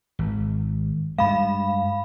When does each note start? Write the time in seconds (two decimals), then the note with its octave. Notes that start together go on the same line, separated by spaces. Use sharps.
0.19 G#1
1.18 G2 G#3 F5 B5